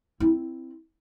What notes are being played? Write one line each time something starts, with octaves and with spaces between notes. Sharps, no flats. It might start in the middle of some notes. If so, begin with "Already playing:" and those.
C4 E4